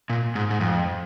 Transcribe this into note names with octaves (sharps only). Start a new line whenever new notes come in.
A#2
G#2
G#2
F2